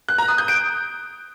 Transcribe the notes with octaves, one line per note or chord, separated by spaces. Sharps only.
F#6
A#5
D#6
G6
D7